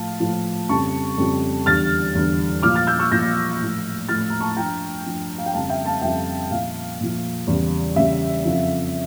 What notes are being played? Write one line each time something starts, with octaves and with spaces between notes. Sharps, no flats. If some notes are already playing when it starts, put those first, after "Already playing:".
Already playing: A2 F3 F5 A5
A2 F3
F2 C#3 G3 A5 C#6
F2 C#3 G3
E2 D3 G3 F6 A6
E2 D3 G3
A#2 F3 D6 F6
F6 A6
E6 G6
C#6 E6
A#2 F3 G6 A#6
A2 F3
A2 F3 F6 A6
A#5
A5 C#6
G2 F3 G5 A#5
G2 F3
F5
G5
F2 C#3 G3 F5 A5
E5 G5
F5 A5
F2 C#3 G3 E5 G5
A#2 F3 F5
A#2 F3
E2 C#3 G3
E2 C#3 G3 E5
F2 C#3 F3